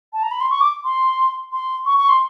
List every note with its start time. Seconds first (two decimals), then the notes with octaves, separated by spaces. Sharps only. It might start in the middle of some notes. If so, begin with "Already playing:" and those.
0.13 A5
0.23 A#5
0.31 B5
0.41 C6
0.50 C#6
0.61 D6
0.84 C6
1.52 C6
1.86 C#6
1.97 C#6
2.09 C6